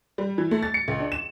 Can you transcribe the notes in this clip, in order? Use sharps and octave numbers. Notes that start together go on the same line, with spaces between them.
G3
E3
A3
A6
C#7
C#2
D4
E7